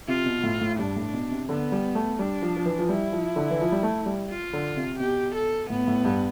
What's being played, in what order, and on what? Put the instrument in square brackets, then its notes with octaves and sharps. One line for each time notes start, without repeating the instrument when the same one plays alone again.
[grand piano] C3 [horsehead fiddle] F4
[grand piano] B2
A2
A2
[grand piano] G2 [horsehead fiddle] D4
[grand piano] A2
B2
C3
[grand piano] D3 [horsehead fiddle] B3
[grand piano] G3
A3
[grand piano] G3 [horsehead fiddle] D4
[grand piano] F3
F3
E3
F3
[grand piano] G3 [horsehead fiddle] E4
[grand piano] F3
D3
E3
F3
G3
A3
G3
[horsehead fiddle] F4
[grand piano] D3
C3
[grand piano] B2 [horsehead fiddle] G4
[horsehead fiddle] A4
[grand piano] A2 [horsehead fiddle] B3
[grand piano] A2
G2